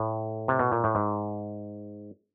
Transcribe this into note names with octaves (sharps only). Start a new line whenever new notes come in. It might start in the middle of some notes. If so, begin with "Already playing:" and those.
Already playing: A2
C3
B2
A#2
A2
G#2